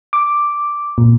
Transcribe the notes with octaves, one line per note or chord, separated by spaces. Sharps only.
D6
A#2